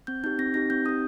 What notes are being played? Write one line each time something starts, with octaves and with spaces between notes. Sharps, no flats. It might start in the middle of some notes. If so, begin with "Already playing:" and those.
C4 G6
D#4 G4 G6
C4 A#6
D#4 G4 A#6
C4 G6
D#4 G4 D#6